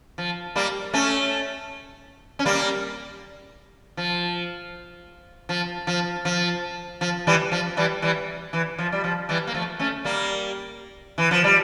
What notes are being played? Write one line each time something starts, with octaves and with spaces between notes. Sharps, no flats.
F3
G3 A#3
A3 C#4
C#4
G3 A#3
F3
F3
F3
F3
F3
E3 G3
F3
E3 G3
E3 G3
E3
F3
G3
F3
E3 G3
A#3
F3 A3
A3 C#4
G3 A#3
E3
F3
G3